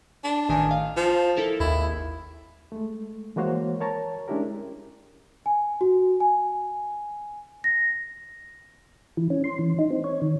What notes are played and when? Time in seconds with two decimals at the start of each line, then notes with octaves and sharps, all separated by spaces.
0.24 D4
0.49 A1 D#3 G#5
0.71 F5
0.97 F3
1.37 E4 A4 A#4
1.60 G#1 D#2 E4
2.72 G#3 A3
3.36 E3 G#3 A#3 F#4 C5 C#5
3.80 A#4 C#5 A5 A#5
4.28 G#3 C#4 D4 E4 G4 A#4
5.46 G#5
5.81 F#4
6.20 G#5
7.64 A#6
9.17 E3
9.30 C#4
9.44 C6
9.59 E3
9.79 D#4
9.91 C4
10.04 C#5
10.22 D#3